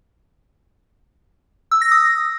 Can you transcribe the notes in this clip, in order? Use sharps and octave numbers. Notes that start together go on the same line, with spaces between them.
E6
A#6
D#6